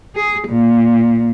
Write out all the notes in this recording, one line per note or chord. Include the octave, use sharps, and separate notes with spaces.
G#4
A#2